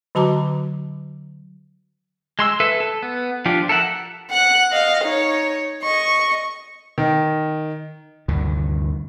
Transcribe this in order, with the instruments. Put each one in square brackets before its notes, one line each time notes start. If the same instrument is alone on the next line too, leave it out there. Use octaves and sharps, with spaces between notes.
[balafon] D3 F#3 F#4 A5 A#5 D6
[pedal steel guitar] G#3 C6 E6
A4 B4 E5
A4
B3
F3 D4 F4 G4
A4 A#4 E5 F#5
[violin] F#5 F#6
D#5 F5
D#4 C#5
D#5 C#6
[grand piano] D#3
[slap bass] D2 G2 C3 D#3